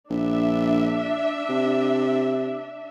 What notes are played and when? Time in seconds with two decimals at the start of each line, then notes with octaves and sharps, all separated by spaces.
0.10 A#1 D4 E5
1.50 C3